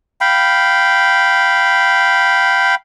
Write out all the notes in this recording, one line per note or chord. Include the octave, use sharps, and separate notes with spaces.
F5 G5 B5